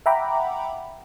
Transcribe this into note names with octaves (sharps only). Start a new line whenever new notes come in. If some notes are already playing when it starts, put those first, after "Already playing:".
E5 F#5 G5 A#5 B5 D6